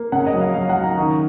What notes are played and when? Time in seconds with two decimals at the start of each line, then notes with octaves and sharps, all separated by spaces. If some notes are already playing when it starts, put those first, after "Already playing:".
Already playing: A#3
0.12 C#3 F#5
0.26 D#5
0.33 F#3
0.41 F5
0.54 F#3 F5
0.69 F#5
0.76 F#3
0.84 A#5
0.97 D#3 C#6